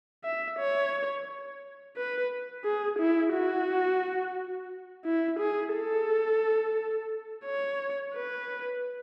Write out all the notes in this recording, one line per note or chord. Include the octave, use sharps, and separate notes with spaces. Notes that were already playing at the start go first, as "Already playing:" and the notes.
E5
C#5
B4
G#4
E4
F#4
E4
G#4
A4
C#5
B4